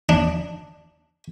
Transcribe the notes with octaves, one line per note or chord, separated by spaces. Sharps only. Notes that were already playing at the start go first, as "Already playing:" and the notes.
D4